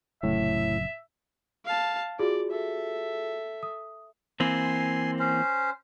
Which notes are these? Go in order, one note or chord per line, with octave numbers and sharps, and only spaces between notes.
F1 A2 C#3 F#3 E5
F5 A5
F4 F#4 G#4 D5
A4 E5
D#6
E3 A#3 C4 G#5 C6
C#4 C5